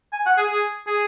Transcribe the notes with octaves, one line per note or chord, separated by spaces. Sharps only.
G#5
F#5
G#4
G#4
G#4